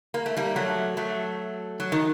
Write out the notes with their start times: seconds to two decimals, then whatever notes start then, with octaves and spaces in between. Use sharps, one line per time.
0.14 A#3
0.26 A3
0.37 G3 A#3
0.56 F#3 A3
0.97 F#3 A3
1.80 F#3
1.92 D#3